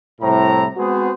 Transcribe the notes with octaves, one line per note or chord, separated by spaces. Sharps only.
C2 A2 E4 C5 A#5
G#3 B3 C4 F#4 G#4 C5